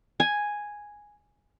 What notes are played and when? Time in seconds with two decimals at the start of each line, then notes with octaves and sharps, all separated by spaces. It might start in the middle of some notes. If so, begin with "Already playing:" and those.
0.20 G#5